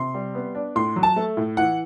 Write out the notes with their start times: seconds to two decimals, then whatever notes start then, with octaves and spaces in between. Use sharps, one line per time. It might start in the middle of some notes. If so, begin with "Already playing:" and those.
Already playing: C3 C6
0.14 G3
0.35 B3
0.55 D4
0.75 A2 C6
0.96 F#3
1.03 A5
1.16 A3
1.37 A2
1.57 E3 F#5